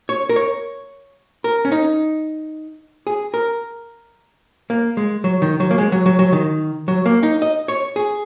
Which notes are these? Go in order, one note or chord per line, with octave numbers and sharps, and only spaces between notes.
C#5
A#4
C#5
A#4
C#4
D#4
G#4
A#4
A#3
G#3
F#3
D#3
F#3
A#3
G#3
F#3
F#3
F#3
D#3
F#3
A#3
D#4
D#5
C#5
G#4